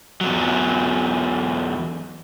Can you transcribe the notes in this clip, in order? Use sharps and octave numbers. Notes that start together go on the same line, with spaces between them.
E2 F#3